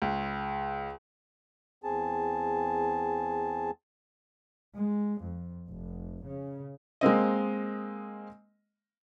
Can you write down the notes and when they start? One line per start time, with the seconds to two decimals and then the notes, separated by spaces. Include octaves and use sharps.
0.02 C#2
1.84 E2 C4 G#4 A5
4.76 G#3
5.21 F2
5.69 F1
6.24 C#3
7.01 G#3 A#3 C4 D#5